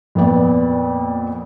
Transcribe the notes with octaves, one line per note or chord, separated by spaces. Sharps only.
F2 A#2 B3 D5